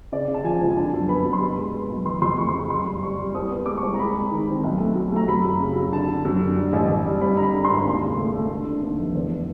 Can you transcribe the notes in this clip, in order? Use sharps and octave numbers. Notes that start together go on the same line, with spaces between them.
C#3 D5
C#3
A5
F3 G#5
C#2
G#5
D3 A5
F#2
B3 B5
F#2
C6
B2 B5
G#3
B3
B1
E3 C6
F2 C6
C#6
A3 C#6
C6
C#3
F#2 C6
G3
G3 C#6
G3
C2 D#6
B3
G#3 D6
C#6
C2
A#5
G#3 B5
G#3
D#3
C4
B1
A3
F#3
A3 A#5
F#2 B5
F#3
C#3
F#3
D3 A5
D3
F#2
D3
G3
A1
A1
G3
G2 B5
D3 A#5
B5
D3
G#1 C6
D#2
C#3
A3
A3
D3
D3
D#2
F1
E2